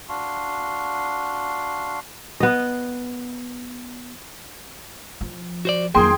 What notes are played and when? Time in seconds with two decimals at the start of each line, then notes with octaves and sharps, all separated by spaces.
0.09 D4 F#4 F5 C6
2.40 B3 D#5
5.21 F3
5.65 F#4 C5 D5
5.95 F2 D#3 F#3 A#3 G#4 G5 C6